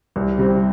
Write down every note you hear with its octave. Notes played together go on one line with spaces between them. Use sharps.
C2
C3 G3 C4